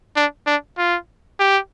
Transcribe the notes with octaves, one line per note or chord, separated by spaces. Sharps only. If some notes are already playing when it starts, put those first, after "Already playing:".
D4
D4
F4
G4